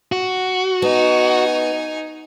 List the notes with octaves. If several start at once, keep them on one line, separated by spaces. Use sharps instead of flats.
F#4
B3 D#4 G#5